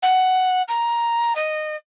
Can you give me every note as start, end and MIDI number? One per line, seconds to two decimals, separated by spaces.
0.02 0.62 78
0.68 1.33 82
1.35 1.76 75